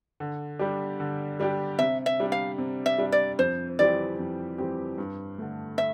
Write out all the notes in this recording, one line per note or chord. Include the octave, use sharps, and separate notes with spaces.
D3
G3 D4 G4
D3
G3 D4 G4
C3 E5
E5
G3 D4
F5
C3
E5
G3 D4
D5
F2 C5
E3 G3 C4 G4 D5
F2
E3 G3 C4 G4
G2
D3 A3
E5